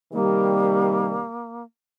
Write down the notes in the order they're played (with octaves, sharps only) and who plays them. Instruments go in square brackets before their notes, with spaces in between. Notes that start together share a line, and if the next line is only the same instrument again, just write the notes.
[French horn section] C3 D#3 G3 [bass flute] A#3